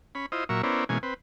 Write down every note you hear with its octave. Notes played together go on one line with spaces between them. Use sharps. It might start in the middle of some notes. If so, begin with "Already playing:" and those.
C#4 B5
E4 F4 C5 D#5
A#2 F#3 A#4 E5 C#6
B3 C#4 E4 A#4 C5 D5
B2 E3 G#3 A#3 C#4 G#5
C4 B4